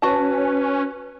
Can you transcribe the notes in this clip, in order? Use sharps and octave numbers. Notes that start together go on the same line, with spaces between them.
C#4 F#4 B4 A5